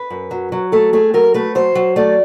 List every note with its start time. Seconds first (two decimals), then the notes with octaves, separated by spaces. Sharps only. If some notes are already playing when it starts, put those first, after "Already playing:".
Already playing: B4
0.10 F#2
0.31 F#3
0.52 F#3
0.72 A3 A4
0.93 A3 G#4
1.14 F#3 A#4
1.34 A3 B4
1.55 F#3 C5
1.75 F#3
1.96 A3 D5